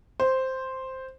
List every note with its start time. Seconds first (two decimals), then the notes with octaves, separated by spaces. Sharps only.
0.20 C5